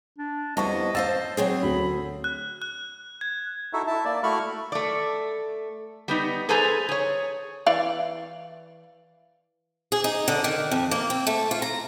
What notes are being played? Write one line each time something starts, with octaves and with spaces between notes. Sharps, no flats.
D4
F2 G3 B3 E4 D#5 A5 C#6
C5 F5 A5 E6 A6
F#3 C4 G#4
D2 B5
F#6
F#6
G#6
D#4 E4 F#4 A4 E5
E4 E5 A5
A#3 D5
A3 E4 F#4 B5 C#6 F6
A3 D5
G3 B3 D#4
G#4 A4 B4 C5 G#5 A#5
G#4 C#5
E3 D5 F5
G#4
D#4
D3
D#3
F2
A#3
C4
A3
F4
A#5